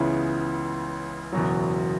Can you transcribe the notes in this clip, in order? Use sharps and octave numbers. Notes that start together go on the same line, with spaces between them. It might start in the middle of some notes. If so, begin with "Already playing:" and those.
Already playing: C#2 C#3 E3 B3 E4
F#1 E2 B2 F#3